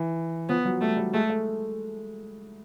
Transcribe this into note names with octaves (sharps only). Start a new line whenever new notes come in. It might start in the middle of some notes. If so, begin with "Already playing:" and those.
Already playing: E3
F3 B3
F#3
G3 A3
G3
G#3 A3
A3